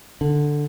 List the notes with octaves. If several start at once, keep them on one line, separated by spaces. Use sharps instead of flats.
D3